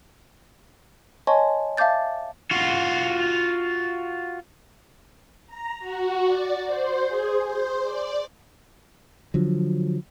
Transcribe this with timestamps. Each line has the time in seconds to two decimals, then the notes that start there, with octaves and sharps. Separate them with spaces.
1.27 C#5 D#5 G#5 A5 C6 C#6
1.77 E5 F5 A5 D6 G6 A6
2.51 F4 F#4
5.47 A#5
5.79 F#4
6.25 D5
6.66 C5
7.07 G#4
7.46 C5
7.82 D5
9.34 D3 F3 F#3